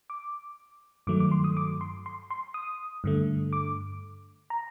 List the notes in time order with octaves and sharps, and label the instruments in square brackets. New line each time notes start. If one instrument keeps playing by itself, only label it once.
[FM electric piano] D6
G2 D#3 F#3 A3 D6
D6
C6
D#6
D6
C6
C6
C6
D#6
G2 D3 A3
D6
A#5